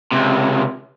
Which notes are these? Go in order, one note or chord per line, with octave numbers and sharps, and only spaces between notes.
C#2 C3